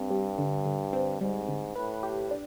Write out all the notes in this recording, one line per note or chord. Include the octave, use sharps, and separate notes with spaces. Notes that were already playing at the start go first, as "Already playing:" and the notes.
Already playing: G2 C4
G3
D3
D3
C4
G#2 G3
D3
A2 B4
G4
D4